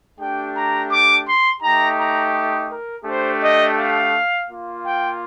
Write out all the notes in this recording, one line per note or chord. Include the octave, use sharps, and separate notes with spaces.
A3 D4 G4 G5
A#5
D6
C6
A3 D#4 G4 A#5
A#5
A#4
A3 D4 G4 C5
D#5
F5
A#3 F4
G5